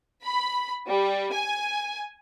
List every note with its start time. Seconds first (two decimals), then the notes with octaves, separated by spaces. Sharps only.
0.24 B5
0.88 G3
1.33 G#5